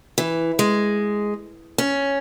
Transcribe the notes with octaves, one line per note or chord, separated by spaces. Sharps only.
E3
G#3
C#4